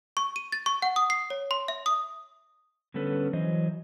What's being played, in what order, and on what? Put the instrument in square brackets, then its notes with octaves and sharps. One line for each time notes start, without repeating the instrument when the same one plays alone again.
[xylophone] C#6
D#7
A6
C#6
F#5
D#6
C7
C#5
C6
E5
D#6
[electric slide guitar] D3 G3 B3 C#4 A4 B4
E3 F#3 C5 D#5